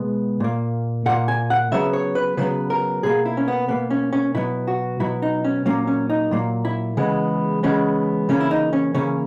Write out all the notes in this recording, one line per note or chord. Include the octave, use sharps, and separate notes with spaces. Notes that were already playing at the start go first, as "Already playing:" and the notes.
Already playing: B2 G#3 B3
A#2 A#3
A#2 A#3 F#5
G#5
F#5
C#3 F#3 B3 E5
C#5
B4
C#3 F#3 B3 B4
A#4
B2 A#3 G#4
E4
C#4
B3
B2 A#3 B3
C#4
C#4
B2 F#3 B3 E4
F#4
B2 F#3 B3 E4
D#4
C#4
A#2 F#3 A#3 C#4
C#4
D#4
A#2 F#3 A#3
E4
C#3 E3 G#3 B3
C#3 E3 G#3 B3 C#4
C#3 E3 A#3 C#4
E4
D#4
C#4
C#3 E3 A#3 C#4